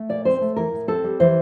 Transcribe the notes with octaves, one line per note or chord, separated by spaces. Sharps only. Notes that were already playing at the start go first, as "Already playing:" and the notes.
Already playing: A3
A#2 D5
C4 C5
A3
E3 A#4
A2
C4 A4
G3
E3 C5